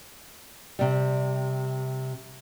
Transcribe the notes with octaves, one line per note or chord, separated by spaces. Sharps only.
C3 G3